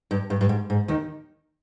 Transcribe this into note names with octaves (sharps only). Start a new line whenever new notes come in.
G2
G2
G2
G#2
G#2
D#2 D#3